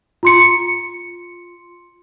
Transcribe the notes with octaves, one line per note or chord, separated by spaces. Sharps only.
F4 C6 C#7